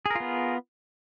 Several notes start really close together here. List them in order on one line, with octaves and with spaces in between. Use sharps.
G#4 A#4 F4 B3